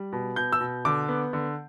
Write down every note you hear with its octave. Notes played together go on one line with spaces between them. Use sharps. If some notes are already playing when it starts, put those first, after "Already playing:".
Already playing: G3
B2
B2 G6
E6
B2
D3 D6
B3
D3